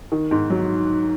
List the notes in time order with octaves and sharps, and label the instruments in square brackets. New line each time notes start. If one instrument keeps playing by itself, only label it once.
[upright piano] D#3
G#2
F#3